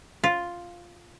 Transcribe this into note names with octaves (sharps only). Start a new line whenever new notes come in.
F4